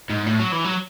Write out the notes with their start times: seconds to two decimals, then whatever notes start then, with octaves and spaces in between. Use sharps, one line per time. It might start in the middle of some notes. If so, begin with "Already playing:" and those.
0.10 G#2
0.26 A2
0.39 F#3
0.52 E3
0.64 F#3